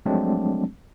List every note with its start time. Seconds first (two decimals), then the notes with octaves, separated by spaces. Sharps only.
0.06 F3 F#3 G#3 A3 C4 D4